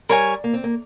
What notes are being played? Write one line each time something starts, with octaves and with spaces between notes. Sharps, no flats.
G3 A#4 C#5 G#5
A#3
C4
A#3